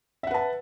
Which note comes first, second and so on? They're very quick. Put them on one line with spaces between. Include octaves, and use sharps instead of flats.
E5 F#5 B4 A5